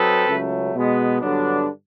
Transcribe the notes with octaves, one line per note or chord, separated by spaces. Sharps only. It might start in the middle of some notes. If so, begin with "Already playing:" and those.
Already playing: F#3 C4 D#4 A4 B4
C#2 C#3 F#3 A3
B2 G#3 B3
G2 D3 F#3 B3 D4